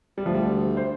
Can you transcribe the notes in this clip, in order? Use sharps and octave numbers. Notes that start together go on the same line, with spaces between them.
D2 D3 G3 A3
F3
G3
C5